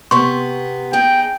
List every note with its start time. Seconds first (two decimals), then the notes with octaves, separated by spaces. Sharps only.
0.11 C3 B3 C6 C#6
0.93 D#4 G#4 G5